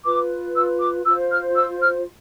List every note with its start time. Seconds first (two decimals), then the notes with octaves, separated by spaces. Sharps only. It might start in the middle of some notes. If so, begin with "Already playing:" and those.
0.04 F4 B4 D6
0.55 E6
0.80 D6
1.05 F4 E6
1.10 C5
1.31 F6
1.56 E6
1.81 F6